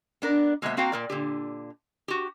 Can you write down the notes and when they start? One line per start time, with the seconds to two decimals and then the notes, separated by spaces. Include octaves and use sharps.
0.22 B3 D4 A#4
0.62 B2 G#3 A#3 B3 C5 E5
0.77 A#3 C4 F#4 F5 G5 A#5
0.92 A#2 A#4 D5
1.10 A#2 D3 G4
2.08 F#4 G4